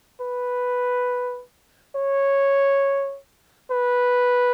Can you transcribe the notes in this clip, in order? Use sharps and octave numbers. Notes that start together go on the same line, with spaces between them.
B4
C#5
B4